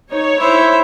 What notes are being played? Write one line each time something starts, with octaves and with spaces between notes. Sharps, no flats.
D#4 C#5
E4 C5 E5